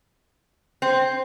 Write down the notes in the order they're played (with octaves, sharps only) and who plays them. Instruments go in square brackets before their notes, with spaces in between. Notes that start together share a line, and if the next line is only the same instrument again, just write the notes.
[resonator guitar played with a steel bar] C4